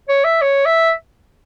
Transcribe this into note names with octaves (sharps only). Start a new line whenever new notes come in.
C#5
E5
C#5
E5